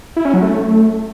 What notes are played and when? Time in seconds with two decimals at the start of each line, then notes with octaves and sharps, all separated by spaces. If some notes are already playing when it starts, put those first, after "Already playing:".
0.17 E4
0.25 C#4
0.34 F#3
0.42 A3